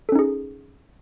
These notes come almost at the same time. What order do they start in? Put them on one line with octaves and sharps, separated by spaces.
A4 C#4 D#4 G#4